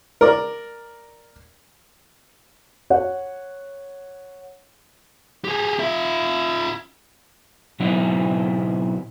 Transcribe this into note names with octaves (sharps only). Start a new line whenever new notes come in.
A#4 D5
C#5 F#5
G4 G#4
F4 E5
B2 F#3 C4 D#4 E4